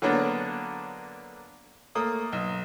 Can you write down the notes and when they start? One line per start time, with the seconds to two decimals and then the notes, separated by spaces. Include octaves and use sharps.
0.02 D3 F#3 A#3 B3 D4
1.95 A3 A#3 D#6
2.33 B1